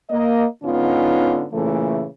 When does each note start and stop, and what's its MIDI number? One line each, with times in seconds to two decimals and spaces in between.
0.10 0.45 58
0.10 0.45 75
0.64 1.46 44
0.64 1.46 50
0.64 1.46 59
0.64 1.46 61
0.64 1.46 63
0.64 1.46 65
1.53 2.05 46
1.53 2.05 49
1.53 2.05 52
1.53 2.05 57